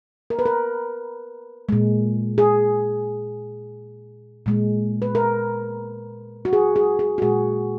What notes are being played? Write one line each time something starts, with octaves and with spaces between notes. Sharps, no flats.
A#4
B4
A#4
A#2 G#3
G#4
A#2 G#3
B4
A#4
F#4
G#4
G#4
G#4
F#4
A#2 G#3 G#4